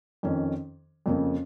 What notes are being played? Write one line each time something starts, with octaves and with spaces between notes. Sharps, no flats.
F2 D#3 C#4
F2 C#3 A#3